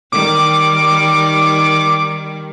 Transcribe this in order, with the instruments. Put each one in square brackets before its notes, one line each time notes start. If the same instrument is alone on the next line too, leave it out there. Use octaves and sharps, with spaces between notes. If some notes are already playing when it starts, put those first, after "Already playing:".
[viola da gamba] D#3 G3 [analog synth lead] D6